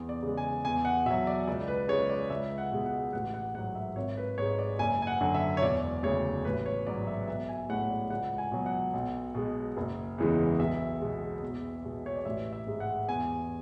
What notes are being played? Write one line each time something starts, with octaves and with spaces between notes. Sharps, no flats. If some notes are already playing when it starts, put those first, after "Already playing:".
Already playing: E2
D5
C#3 G#3
G#5
E2 G#5
F#5
B2 F#3 E5
D5
C#2 D5
B4
C#3 G#3 C#5
D5
C#2 E5
F#5
B2 G#3
F#5
A1 F#5
F#5
G#2 F#3 F#5
E5
G#1 C#5
B4
G#2 G#3 C#5
D5
F#1 G#5
G#5
F#5
F#2 D3 F#3
E5
C#5
E1 D5
D2 C#3 C#5
A1 B4
C#5
G#2 F#3 D5
E5
B1 E5
G#5
A2 G#3 F#5
D5
C#2 F#5
G#5
B2 F#3
F#5
B1
B2 G#3
F#1
E2 C#3 E3 G#3
B1 E5
B2 G#3
E2
B2 G#3
C#5
D5
A1 E5
E5
G#2 G#3
F#5
E2 G#5